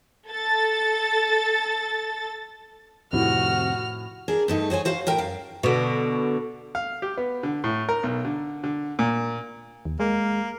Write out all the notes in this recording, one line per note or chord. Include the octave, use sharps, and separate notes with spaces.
A4 A6
F2 A2 C3 D#3 F#4 F6
D4 G#4 A#4
G2 A3 D#4
F#4 C5 C#5 G#5
F#4 C5 F5
A2 A#4 G5 A#5
F#2 F5
B2 D3
F5
G4
B3
D3
A2
A#4
B1
D3
D3
A#2
D#2
G#3 A#3